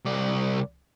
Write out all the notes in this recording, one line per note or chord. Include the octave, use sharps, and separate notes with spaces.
C2 D5